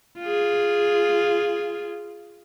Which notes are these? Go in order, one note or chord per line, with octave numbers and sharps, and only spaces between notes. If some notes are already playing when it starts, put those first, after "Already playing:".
F4 G#4